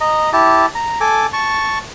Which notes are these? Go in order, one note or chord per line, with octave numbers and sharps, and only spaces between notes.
D#5 A#5
E4 G4 A5
A#5
A4 G#5 D6
A5 C#6